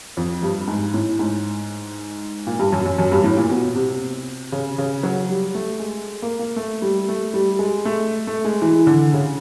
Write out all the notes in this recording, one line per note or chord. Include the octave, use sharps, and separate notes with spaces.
F2
G2
G#2
A2
G#2
A#2
G2
F#2
F#2
F#2
G2
A2
A#2
B2
C3
C#3
C#3
F#3
G3
A3
G#3
A#3
A#3
A3
G3
A3
G3
G#3
A3
A3
G#3
E3
D3
C#3